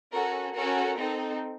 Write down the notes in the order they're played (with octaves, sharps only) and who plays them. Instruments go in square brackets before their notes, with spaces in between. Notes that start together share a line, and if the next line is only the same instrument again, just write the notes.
[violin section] C#4 F#4 A4 A#4
C#4 F#4 A4 A#4
C4 D#4 A4